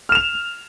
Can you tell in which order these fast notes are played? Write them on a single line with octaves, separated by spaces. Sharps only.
F6 E7 F7